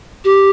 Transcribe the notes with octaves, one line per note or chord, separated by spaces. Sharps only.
G4